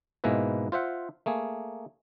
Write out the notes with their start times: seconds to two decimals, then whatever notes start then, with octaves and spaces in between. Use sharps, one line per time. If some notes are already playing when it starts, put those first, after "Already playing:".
0.24 G#2 B2 G#3 A#3 E4 B4
0.72 F4 C5 E5 F#5
1.26 A3 A#3 G#4